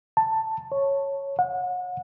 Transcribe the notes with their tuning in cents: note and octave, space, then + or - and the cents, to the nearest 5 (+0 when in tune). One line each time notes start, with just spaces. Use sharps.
A5 +10
C#5 -5
F#5 -35